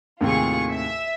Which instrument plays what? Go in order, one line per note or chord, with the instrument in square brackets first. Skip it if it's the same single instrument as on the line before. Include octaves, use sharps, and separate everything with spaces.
[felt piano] D#2 A2 C3 [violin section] F4 G#4 C#6
[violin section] E5